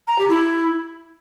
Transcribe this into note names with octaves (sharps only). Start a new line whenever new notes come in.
A#5
G4
E4